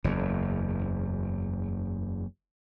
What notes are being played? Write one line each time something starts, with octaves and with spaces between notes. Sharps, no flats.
F#1 E2